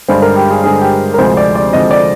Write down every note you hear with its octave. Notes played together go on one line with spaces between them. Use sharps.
G2 D3 G#3 C5
A#4
G4
G#4
G2 D3 G#3 G#4
G4
A#4
D2 C3 F3 G#3 C5
D5
D5
D2 C3 F3 G#3 D#5
D5